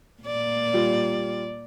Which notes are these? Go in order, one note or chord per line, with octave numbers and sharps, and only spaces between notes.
A#2 A#3 D5
G3 F4